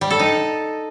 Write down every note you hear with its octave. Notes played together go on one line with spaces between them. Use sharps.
G3
A4
D#4